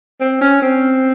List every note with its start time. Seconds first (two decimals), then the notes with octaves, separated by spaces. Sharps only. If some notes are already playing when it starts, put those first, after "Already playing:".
0.21 C4
0.41 C#4
0.62 C4